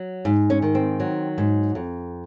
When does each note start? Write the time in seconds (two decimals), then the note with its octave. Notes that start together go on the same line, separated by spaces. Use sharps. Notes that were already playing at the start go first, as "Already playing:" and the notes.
Already playing: F#3
0.25 G#2
0.50 C#4
0.62 D#3
0.75 C4
1.00 F#3
1.38 G#2
1.75 F2